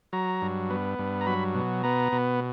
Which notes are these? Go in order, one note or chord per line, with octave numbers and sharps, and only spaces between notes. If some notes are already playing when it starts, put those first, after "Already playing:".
F#3 A#5
G2
B3
G2
A#5
F#3 B5
B2
B3 A#5
B2